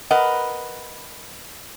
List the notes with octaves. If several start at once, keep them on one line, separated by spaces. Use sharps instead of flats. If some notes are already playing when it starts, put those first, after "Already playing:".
A#4 B4 D#5 F#5